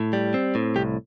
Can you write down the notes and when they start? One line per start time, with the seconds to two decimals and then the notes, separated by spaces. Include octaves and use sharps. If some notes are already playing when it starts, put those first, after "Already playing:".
Already playing: A2
0.13 G3
0.34 C4
0.55 A2
0.76 C2 G4